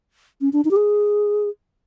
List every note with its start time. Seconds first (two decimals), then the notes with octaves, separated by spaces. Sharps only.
0.41 C#4
0.53 D4
0.65 D#4
0.71 G4
0.76 G#4